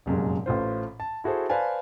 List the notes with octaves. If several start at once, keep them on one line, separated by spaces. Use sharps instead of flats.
F1 F#2 A#2 G#3
A1 A2 F4 C5
A5
E4 F#4 G#4 A4 C5
B4 C5 D5 F5 G#5 A5